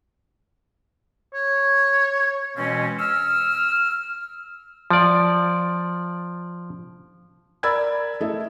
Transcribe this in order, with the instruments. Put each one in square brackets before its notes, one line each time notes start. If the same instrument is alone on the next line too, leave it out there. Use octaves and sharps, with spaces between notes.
[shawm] C#5
[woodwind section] B2 E3 G#3 A#3 C4 C#4
E6 F6
[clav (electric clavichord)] F3 D5
[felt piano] A#4 D5 B5 E6 G#6 A6
A3 E4 A4 D#5 E5